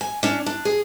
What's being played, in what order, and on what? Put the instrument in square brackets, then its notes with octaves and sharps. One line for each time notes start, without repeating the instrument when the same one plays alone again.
[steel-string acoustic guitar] G#5
C#4 D4
D4
G#4